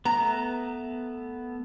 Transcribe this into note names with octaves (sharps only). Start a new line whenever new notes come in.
A3 B3 A#5